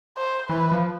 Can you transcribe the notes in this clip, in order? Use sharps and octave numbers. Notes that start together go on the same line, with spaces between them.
C5
E3 B4
F3